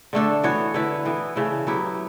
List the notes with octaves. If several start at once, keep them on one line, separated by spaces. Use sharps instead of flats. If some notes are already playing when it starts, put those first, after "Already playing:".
D3 A3 D4 A4
E3 B3 F#4 C#5
D3 A3 E4 B4
E3 B3 E4
C#3 E3 A3 E4
F#3 B3 E4 G4